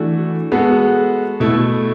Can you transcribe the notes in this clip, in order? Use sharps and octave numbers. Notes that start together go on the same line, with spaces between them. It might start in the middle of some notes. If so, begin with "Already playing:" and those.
Already playing: E3 A3 D4 F#4
G#3 B3 F#4 A4
B2 A3 E4